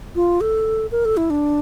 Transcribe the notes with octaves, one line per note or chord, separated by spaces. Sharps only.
F4
A4
A#4
A4
E4
D4